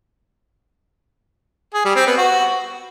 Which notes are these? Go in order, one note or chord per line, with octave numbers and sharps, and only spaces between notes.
G#4
G3
C4
B3
F#4